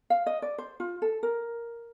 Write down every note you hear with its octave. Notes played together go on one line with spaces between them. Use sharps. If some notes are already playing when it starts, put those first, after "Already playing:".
F5
D#5
D5
C5
F4
A4
A#4